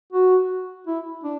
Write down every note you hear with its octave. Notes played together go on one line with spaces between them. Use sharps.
F#4
E4
D4